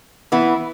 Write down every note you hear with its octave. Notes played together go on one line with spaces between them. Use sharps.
E3 B3 E4